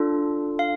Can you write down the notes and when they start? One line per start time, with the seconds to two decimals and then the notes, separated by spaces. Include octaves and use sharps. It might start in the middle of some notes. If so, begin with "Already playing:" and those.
Already playing: D4 F4 A4
0.59 F5